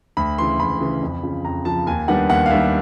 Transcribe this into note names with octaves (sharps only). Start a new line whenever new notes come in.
D2 B5
C#3 E3 C6
D2 B5
C#3 E3
F2
C#3 F3
F2 A#5
C#3 F3 A5
D#2 G#5
D#3 G3 B3 D4 F#5
D#2 F#5
F5
D#3 G3 B3 D4 E5